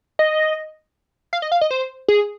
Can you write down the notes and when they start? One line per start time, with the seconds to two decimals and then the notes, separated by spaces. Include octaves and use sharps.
0.19 D#5
1.33 F5
1.42 D#5
1.52 F5
1.61 D#5
1.71 C5
2.08 G#4